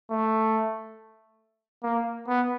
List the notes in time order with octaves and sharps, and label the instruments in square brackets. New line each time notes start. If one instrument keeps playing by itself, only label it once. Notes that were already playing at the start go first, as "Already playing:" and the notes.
[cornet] A3
A#3
B3